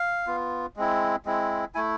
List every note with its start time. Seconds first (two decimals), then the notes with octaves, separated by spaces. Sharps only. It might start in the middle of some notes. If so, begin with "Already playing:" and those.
Already playing: F5
0.27 B3 F4
0.76 G#3 C4 E4
1.25 G#3 C4 E4
1.75 A3 E4 G#5